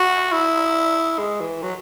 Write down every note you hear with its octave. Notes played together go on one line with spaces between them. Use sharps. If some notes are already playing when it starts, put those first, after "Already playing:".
Already playing: F#4
E4
G#3
E3
F#3